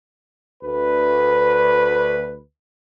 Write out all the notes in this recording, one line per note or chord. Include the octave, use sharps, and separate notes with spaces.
D2 B4